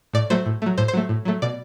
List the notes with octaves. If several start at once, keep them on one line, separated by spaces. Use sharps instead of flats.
A2 D5
F#3 A3 C5
A2
F#3 A3
A2 C5
C5
F#3 A3
A2
F#3 A3
B2 D5